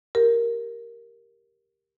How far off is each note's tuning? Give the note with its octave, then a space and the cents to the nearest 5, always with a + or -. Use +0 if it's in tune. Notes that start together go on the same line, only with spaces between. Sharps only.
G4 +0 A#4 +0